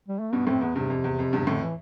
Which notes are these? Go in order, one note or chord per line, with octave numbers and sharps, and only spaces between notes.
G3
A3
G2 B2 B3
F2 A2 C4
E2 B3
E2 G2 C3
F2
E2
F2
E2 G2
C3
F2 A2 D3
E3